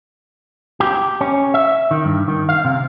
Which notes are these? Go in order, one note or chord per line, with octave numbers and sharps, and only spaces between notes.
G4
C#4
E5
D#3
G2
D#3
F5
C3